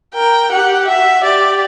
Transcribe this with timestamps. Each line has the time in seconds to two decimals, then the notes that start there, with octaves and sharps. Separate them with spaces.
0.15 A#4 G5
0.52 G4 F#5
0.87 F#4 E5
1.24 G4 D5